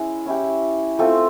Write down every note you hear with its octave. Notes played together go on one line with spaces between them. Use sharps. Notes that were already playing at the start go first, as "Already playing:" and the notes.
Already playing: G#3 C#4 E4
C#4 E4 G4
A3 C4 F4 A4